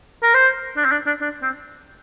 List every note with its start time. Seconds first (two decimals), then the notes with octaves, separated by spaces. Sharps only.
0.23 A#4
0.34 C5
0.77 D4
0.85 C4
0.91 D4
1.07 D4
1.21 D4
1.42 C4